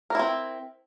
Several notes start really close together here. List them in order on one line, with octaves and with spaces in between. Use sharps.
A#4 E4 C4